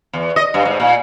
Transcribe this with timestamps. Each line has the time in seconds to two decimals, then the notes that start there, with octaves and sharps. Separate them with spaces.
0.13 E2
0.36 D#5
0.54 G2
0.65 G#2
0.80 A#2